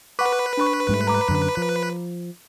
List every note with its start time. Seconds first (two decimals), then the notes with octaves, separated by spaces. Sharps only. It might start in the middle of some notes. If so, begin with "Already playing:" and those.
0.19 B4 F#5 C#6 D6
0.57 D4 B5 C#6
0.89 G#2 G3 A3
1.07 A#5 B5 D6
1.29 F#2 D3
1.57 F3